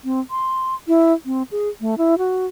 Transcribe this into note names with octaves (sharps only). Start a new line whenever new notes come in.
C4
C6
E4
C4
G#4
A3
E4
F#4